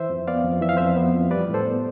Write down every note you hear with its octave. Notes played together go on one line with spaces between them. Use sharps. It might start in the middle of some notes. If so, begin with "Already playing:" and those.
Already playing: E3 C5 E5
F2
B3 D5 F5
F2
E3 E5
F5
F2 C5 E5
B3
F2
G3 B4 D5
A2
A4 C5
B3